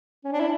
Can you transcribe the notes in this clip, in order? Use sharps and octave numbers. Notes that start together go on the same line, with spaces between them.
C#4
D4
E4